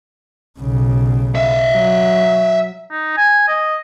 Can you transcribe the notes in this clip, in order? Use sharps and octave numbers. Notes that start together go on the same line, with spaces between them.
B1 C#3
E5 F5
F#3
D#4
G#5
D#5